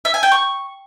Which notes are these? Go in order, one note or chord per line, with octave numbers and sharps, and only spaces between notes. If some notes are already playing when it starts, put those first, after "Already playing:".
E5
G#5
G5
C#6